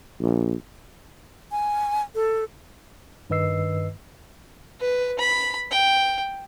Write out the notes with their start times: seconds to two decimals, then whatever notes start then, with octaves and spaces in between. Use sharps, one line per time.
0.21 A#1
1.52 G#5
2.15 A4
3.30 G2 D#3 B4 D#5 E6 C7
4.81 B4
5.19 B5
5.71 G5